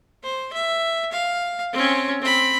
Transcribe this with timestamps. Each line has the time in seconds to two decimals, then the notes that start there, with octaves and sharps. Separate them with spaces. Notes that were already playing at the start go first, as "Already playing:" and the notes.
0.24 C5
0.53 E5
1.12 F5
1.73 C4 C#4
2.22 C4 B5